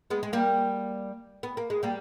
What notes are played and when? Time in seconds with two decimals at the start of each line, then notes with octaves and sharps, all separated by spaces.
0.10 G#3 B3
0.23 G#3
0.33 G3 A#3
1.43 B3
1.57 A#3
1.70 G#3
1.83 G3 A#3